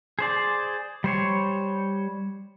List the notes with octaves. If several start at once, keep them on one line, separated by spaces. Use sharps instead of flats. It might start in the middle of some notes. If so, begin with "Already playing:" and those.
G#4 C5 D5
G3 C5 C#5